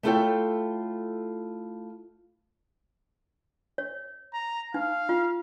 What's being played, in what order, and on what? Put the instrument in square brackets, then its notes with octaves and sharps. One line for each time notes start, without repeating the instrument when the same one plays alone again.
[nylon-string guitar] A3 E4 F4 A4 C#5 G5
[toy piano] C#5
[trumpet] A#5
[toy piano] D#4 [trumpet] F5
[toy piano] F4